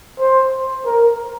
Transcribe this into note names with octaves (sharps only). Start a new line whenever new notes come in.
C5
A#4